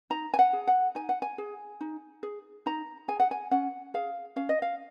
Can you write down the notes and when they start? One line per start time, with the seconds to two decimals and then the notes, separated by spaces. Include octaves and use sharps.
0.10 D#4 A#5
0.34 G#5
0.39 F#5
0.53 G#4
0.67 F#5
0.95 D#4 G#5
1.09 F#5
1.22 G#5
1.38 G#4
1.81 D#4
2.23 G#4
2.66 D#4 A#5
3.08 G#4 G#5
3.20 F#5
3.31 G#5
3.51 C#4 F#5
3.94 G#4 F5
4.36 C#4 F5
4.49 D#5
4.62 F5